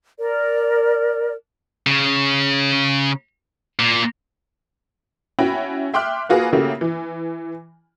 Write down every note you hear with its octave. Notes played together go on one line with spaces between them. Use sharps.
A#4 D5
C#3
A#2
C#4 E4 F#4 G5 B5
E5 G5 C6 D6 F6 F#6
A#3 F4 F#4 G#4 B4
C#3 A3 A#3 E4 F#4 G4
E3